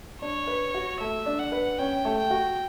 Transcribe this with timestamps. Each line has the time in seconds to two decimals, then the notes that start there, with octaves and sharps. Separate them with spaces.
0.22 D4 C#5
0.47 B4
0.74 F#4
1.00 A3 E5
1.26 D4
1.39 F#5
1.52 B4
1.78 C#4 G5
2.05 A3
2.18 G5
2.31 F#4